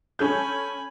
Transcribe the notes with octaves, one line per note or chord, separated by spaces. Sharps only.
C#4 A4 G#5 B5 G6